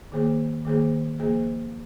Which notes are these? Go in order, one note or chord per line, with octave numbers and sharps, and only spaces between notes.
D#3 A#3 G#4 C5
D#3 A#3 G#4 C5
F3 A#3 G#4 C5